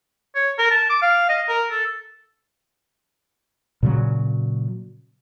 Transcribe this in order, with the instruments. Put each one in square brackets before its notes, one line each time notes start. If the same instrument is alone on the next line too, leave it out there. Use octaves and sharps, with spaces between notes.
[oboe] C#5
A#4
A5
D6
F5
D#5
A#4
A4
[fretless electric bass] A#2 C#3 F#3